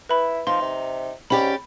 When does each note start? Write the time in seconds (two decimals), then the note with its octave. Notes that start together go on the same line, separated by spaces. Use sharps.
0.09 E4 B4 B5
0.47 F3 D#4 C6
0.61 C3
1.30 G#2 C#4 G4 D5 B5